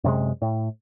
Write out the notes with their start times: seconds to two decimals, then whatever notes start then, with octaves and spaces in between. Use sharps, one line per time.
0.04 F#2 C3 G#3
0.42 A2